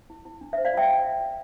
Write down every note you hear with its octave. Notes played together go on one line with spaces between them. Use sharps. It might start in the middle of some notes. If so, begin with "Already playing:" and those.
E4
E4
D4
E5
C5
D5 F5
F4 E5 G5